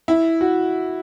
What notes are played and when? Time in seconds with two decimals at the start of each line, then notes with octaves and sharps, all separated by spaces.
0.08 E4
0.41 F#4